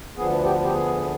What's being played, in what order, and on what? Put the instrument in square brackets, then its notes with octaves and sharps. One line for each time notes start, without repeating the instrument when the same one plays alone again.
[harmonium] D2 D3 F3 B3 G#4
G4
G4
G#4